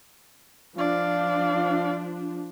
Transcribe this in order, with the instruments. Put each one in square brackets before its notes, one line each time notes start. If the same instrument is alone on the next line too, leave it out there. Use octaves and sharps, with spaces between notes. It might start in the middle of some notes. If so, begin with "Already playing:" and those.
[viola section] F3 D4 [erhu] D5 [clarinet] F5